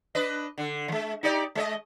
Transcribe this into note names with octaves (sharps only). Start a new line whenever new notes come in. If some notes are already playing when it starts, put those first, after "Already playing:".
D4 B4 D#5
D3
E3 G#3
D#4 G4 D5
G#3 C#5 D#5